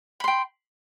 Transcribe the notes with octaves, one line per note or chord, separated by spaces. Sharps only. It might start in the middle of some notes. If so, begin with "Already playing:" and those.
G5 B5 C6